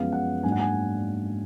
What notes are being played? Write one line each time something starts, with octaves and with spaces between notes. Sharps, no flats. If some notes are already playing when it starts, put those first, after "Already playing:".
Already playing: F#2 F3 G#3 B3 F5
F#5
G#2 F#3 A#3 D4 G#5
F#5
G#5